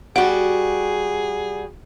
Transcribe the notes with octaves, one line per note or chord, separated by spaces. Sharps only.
G3 F#4 G#4 F#5